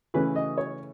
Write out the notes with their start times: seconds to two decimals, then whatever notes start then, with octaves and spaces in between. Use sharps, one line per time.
0.14 C#3 E3 A3 C#4 B4
0.36 D#5
0.58 C#5